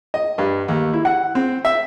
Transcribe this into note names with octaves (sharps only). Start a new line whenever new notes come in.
D#5
G2
D#2
E4
F#5
C4
E5